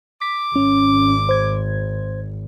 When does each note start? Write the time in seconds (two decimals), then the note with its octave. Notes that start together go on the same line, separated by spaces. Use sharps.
0.22 D6 B6
0.56 G#1 C#4
1.29 C5 G#6